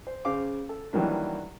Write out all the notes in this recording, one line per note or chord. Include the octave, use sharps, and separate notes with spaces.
C5
C#3 C5 F5 D6
A4
D#3 E3 F#3 G3 A#3 D4